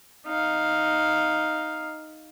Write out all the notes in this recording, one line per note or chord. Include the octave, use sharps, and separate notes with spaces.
D#4 F5